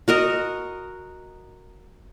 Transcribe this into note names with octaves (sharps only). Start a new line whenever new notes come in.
F#4 A#4 D#5